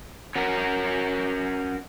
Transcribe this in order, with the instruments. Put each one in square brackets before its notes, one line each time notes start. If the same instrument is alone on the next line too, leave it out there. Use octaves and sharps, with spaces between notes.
[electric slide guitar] C#4 F#4 A#4